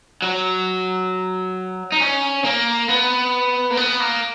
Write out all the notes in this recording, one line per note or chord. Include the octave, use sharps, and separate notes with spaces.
F#3
D#4
C#4
A#3
B3
A#3
B3
A#3